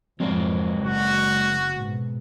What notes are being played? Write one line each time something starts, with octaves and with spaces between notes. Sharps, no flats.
F2 G#2 F#3 G#3 C4 A#4 D5
F#1 F#4
G#2 B2